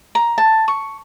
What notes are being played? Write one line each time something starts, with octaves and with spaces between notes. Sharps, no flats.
A#5
A5
C#6